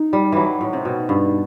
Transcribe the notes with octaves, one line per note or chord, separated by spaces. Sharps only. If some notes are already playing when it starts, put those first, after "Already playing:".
Already playing: D#4
G3
E3 F#3
A2
C3
B2
G2